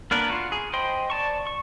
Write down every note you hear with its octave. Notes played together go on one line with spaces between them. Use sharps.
A#3 B3 D4 A#4 B4
F4 F#4
G#4
C5 D#5 G5 B5 C6
D5 A5 C#6
C#6